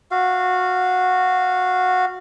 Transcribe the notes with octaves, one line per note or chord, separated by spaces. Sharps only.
F#4 F5